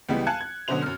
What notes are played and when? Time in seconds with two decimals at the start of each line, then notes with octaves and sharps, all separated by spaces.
0.09 C#2 E3 G3 G#3 B3 G5
0.27 F5 G#5 A5 F#6 G#6 C#7
0.41 G#6
0.68 B2 D3 F#3 C#4 C5 F7
0.82 F#2 F6